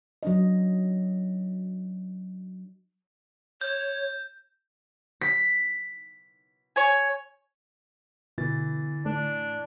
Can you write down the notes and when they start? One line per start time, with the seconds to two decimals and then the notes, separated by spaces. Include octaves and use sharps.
0.23 F#3 D4 D#5
3.61 C#5 G6
5.21 B6
6.76 C#5 G#5
8.38 B2 D3 E3 A6
9.06 A2 D4